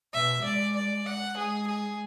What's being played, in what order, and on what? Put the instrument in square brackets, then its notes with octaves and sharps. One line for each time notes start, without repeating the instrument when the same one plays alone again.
[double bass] B2 [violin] E5
[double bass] G#3 [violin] D5
[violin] D5
F#5
[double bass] G#3 [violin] G#4
[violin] G#4